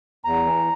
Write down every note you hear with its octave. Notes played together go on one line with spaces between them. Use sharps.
E2 A#5
E3